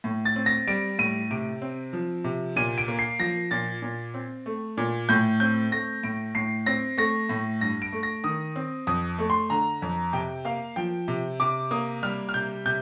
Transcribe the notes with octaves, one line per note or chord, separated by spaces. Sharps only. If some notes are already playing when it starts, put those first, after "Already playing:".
A2
A6
C4
A#6
G3 D7
A2 D#7
C3 D7
C4
F3
C3
A#2 D#7
D7
A#3
C7
F3 A#6
A#2 A6
A#2
C4
A3
A#2
A2 G6
C4 G6
A3 A#6
A2 D7
A2 C7
C4 A#6
A3 A#6
A2
G2 A#6
D7
A3
A#6
D#3 D#6
C4
F2 D#6
A3
C6
D3 A#5
F2
C3 G5
A#3 F5
F3 G5
C3
C3 D6
A#3 D#6
G3 F6
F6
C3 G6
C3 G6